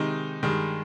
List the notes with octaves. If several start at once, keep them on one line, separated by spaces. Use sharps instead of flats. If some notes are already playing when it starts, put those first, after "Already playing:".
Already playing: C3 D#3 G#3 D#4
G2 D#3 G#3